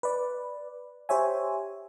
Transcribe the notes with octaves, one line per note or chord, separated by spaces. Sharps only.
B4 D5
G4 C5 C#5 E5 G#5